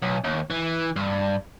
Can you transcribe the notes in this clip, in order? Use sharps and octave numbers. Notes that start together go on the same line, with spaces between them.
B1
D#2
E3
G2